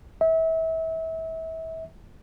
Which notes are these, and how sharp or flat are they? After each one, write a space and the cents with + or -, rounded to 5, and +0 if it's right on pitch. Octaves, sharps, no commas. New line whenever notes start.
E5 -30